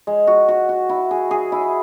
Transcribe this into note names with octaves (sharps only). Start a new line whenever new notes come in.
G#3
F#4
F#4
F#4
E4
G#4
G#4
E4